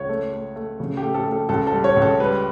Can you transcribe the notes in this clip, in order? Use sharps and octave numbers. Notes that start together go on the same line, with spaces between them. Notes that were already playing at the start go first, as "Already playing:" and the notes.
Already playing: C#2 C#5
A3
A3
A3
C#3
G4
A3
A4
A3
A4
C#2 A4
A4
G3
C#5
C#2
A4
G3 B4